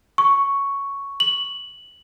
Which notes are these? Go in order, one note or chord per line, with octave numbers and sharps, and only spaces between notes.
C#6
F#7